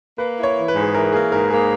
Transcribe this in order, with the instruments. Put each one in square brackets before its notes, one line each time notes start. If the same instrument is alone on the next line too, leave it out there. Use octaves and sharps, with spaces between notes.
[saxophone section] A#3 [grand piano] B4
[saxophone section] E4
[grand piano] C#5
[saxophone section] E3
[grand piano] B4
[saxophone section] G#2
[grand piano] G#4
[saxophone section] E3 [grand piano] A#4
[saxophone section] A#3 [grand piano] G#4
[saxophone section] G#2 [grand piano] A#4
[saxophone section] A#3 [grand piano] G#4